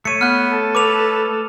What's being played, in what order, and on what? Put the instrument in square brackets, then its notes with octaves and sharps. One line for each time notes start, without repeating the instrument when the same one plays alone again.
[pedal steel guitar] A3 C#5 [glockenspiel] C#7 D#7
[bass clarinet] B3 [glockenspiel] F6 F#6
[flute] A4
[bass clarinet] B4 [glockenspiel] D6 F7